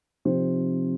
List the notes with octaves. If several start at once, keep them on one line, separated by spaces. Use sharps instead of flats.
C3 F3 C4 D#4 C5